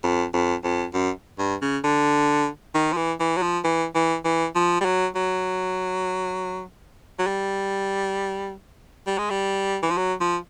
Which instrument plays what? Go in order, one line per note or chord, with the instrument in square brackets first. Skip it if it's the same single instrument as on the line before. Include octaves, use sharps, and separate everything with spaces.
[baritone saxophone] F2
F2
F2
F#2
G2
C#3
D3
D#3
F3
E3
E3
F#3
F3
E3
E3
E3
F3
G3
F#3
F#3
F#3
G3
G3
G#3
G3
E3
F3
F#3
F3